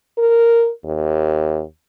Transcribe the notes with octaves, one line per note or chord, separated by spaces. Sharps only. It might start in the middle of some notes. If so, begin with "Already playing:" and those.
A#4
D#2